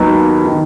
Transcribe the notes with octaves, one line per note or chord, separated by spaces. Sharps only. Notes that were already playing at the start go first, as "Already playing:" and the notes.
Already playing: D#2 D#3 F#3 B3
D#3